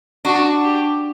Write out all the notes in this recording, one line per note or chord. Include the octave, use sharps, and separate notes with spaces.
D4 F#4
G4